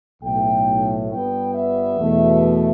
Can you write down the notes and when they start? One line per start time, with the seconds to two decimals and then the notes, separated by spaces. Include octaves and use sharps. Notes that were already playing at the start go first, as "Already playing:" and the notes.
0.22 B1 A2 A3 G5
1.10 G1 G2 G3 B3 G5
1.54 E5
1.98 E2 B2 A3